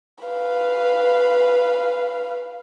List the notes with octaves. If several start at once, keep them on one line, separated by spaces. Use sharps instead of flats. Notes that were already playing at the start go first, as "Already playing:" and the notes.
B4 F5